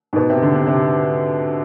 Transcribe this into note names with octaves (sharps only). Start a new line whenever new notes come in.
G#2
B2
C3
D3
C3
C3